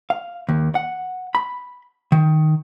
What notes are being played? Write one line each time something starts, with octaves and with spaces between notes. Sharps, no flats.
F5
D#2
F#5
B5
D#3